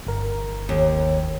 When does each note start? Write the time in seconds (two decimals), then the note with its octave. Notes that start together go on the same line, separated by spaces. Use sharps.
0.07 G1 A#4
0.69 D#2